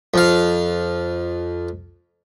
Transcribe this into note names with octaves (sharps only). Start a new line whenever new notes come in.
F2 F5